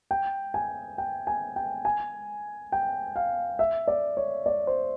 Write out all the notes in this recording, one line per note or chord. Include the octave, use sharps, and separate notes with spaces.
G5
G#5
G5
G#5
G5
G#5
G5
F5
E5
D5
C#5
D5
C5